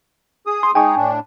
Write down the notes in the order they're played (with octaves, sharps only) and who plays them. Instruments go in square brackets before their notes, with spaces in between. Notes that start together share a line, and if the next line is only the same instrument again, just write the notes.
[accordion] G#4 D#6
[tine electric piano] C6
[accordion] G#3 D#4 G#4 [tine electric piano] G5 G#5 C#6
[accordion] A2 D4